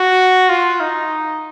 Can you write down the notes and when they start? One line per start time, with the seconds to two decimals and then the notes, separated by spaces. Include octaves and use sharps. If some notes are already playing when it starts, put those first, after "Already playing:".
Already playing: F#4
0.49 F4
0.80 D#4